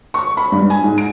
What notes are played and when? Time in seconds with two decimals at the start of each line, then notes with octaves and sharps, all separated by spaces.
0.14 C#6
0.37 B5
0.52 G2
0.70 G#5
0.84 G#2
0.98 D7